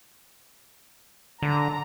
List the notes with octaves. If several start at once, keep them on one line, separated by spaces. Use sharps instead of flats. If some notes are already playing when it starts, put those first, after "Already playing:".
D3 A#5